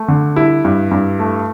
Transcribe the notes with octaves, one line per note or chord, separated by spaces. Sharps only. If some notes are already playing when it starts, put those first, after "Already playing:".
Already playing: A3
D3
G3 E4
G2
G2
A3